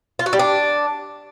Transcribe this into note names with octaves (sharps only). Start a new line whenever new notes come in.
F4
F#4
G3
D4